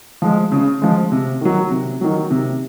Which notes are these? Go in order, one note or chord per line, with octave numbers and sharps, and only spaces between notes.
F3 G#3
C#3
F3 G#3
C3
D#3 F#3
C3
D#3 F#3
C3